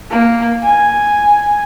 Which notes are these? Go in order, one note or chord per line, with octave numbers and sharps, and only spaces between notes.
A#3
G#5